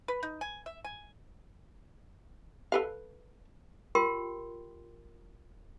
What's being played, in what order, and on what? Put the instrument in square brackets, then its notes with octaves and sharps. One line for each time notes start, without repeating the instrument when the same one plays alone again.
[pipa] B4
D#4
G#5
E5
G#5
[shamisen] A4 B4 F5
[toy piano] F4 G4 A#4 G5 C6